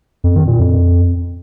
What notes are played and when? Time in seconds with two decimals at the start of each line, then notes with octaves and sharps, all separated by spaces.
0.24 F2
0.36 D#3
0.47 A#2
0.59 F2